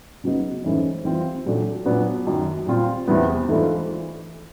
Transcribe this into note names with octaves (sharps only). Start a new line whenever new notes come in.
C#3 F#3 B3 D#4
G#2 E3 A3 C#4
E3 G3 C4 F4
A#2 F#3 A3 D4
A#2 F#3 B3 D4
F#2 D#3 F#3
A#2 G3 C4 F4
E2 C3 E3 G3 B3
G#2 E3 A3 D4 F4